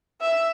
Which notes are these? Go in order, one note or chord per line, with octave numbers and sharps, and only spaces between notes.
E5